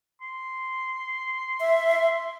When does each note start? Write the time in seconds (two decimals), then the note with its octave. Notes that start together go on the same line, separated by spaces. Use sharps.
0.21 C6
1.60 E5